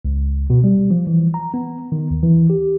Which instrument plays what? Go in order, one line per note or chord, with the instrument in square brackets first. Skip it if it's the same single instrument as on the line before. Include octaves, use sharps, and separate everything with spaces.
[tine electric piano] C#2
B2
G3
F3
E3
A#5
B3
D#3
D#2
E3
G4